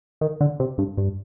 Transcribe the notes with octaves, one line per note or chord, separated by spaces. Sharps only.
D#3
D3
C3
G2
G2